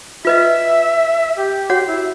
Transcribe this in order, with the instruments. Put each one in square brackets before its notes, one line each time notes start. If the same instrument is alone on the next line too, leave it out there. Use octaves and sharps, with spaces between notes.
[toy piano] F4 B4 D#5 [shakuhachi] E5
[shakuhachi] G4
[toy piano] F#4 C#5 F#5
[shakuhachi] E4